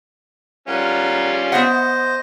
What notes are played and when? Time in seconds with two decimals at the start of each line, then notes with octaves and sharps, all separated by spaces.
0.68 G3 C#4 F4 A#4 F#5
1.52 B3 C5 D#5 E5 F#5